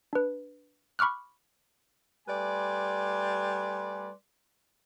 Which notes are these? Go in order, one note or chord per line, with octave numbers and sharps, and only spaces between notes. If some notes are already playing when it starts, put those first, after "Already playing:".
D4 B4
B5 C#6 D6 F6 F#6
G3 A3 B4 D5 G#5 C6